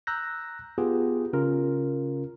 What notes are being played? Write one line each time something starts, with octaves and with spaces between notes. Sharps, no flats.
A#5 E6 F#6 G6 A#6
B3 F4 G4 G#4
C#3 C#4 F4 A#4